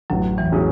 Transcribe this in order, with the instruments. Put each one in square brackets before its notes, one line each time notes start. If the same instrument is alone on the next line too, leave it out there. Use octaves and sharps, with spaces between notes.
[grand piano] A1 [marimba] F#2 F#3
[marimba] E2 E3
[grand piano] A2 F#3 C#4 G#4